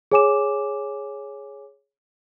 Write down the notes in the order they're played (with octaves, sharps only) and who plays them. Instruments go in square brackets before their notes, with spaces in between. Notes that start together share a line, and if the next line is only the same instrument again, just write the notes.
[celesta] G#4 C#5 G#5 D6 E7